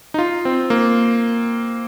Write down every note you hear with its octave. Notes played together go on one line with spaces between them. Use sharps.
D#4
F4
C4
A#3